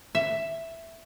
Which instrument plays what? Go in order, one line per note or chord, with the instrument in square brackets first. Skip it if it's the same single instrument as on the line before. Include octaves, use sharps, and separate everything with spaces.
[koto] E5